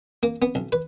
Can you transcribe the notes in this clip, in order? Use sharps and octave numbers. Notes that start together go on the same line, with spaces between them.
A#3
B3
B1
B4